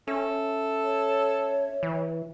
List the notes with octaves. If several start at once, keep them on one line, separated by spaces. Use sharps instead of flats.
C#4 A4 E5
C#5
E3